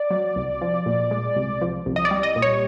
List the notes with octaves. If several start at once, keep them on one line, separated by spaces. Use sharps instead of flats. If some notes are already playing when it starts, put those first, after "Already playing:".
Already playing: D5
F#3
C2
F3
A#2
G#3
C2
F3
C2
D#5
D5
G3
D#5
A#2
C#5